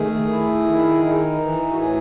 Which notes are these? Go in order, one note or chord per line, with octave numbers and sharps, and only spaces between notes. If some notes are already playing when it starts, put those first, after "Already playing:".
Already playing: D#3 A3 G#4
E4
D#3
D#4
E3
F#4
A2 G#4